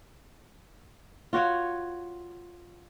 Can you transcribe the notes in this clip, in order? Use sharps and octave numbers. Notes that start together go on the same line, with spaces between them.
F4 F#4 C#5 F#5